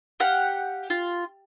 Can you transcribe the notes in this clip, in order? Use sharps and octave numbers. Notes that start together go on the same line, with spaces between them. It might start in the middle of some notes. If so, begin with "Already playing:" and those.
G4 F5 F#5
F4